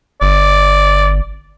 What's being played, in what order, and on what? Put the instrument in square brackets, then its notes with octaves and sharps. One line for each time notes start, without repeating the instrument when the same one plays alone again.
[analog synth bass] G1 [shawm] D5